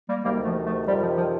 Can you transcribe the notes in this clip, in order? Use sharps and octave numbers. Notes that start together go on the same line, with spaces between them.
G3 A#3
D2 C3 D#3 G3 A#3
F3 A3
F3 A3
F2 C3 D#3 G3
F3
F3